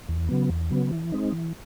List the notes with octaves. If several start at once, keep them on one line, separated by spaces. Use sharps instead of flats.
E2
C#3 F#3 B3
E2
C#3 F#3 B3
E3
G#3 C4 D#4
E3